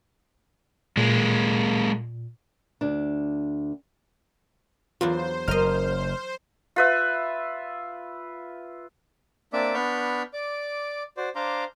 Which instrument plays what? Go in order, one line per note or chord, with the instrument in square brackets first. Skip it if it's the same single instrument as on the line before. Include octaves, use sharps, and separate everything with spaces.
[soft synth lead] A#2 [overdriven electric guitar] G#3 A#3
[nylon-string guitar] D2 D4
[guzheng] E2 F#3 D4 [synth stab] F4 [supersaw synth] C5
[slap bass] F#1 F#2 [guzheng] A#4 D#5 [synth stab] F6
[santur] F4 B4 E5
[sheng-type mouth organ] A#3 C4 D4 D5 E5 D6
B3 D4 B5 C#6 F6 G6
D5 D6
F#4 C5 D5
D4 C5 F5 A#5 C6 D6